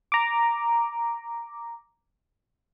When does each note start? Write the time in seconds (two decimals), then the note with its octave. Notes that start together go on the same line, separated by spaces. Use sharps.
0.12 A#5 D6